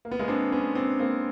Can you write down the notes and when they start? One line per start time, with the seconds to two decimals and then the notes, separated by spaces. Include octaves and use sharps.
0.05 A#3
0.11 B3
0.19 G#3 A#3
0.28 C4 D4
0.52 B3 C#4
0.75 C4 D4
0.99 A#3 C4